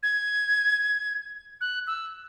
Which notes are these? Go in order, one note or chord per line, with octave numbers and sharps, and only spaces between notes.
G#6
F#6
E6